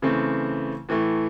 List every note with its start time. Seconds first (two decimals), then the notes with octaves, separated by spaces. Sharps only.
0.02 C#3 E3 A3 C4
0.89 A2 E3 A3